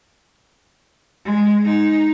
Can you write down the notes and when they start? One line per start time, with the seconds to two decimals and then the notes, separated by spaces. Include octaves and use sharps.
1.25 G#3
1.66 D#4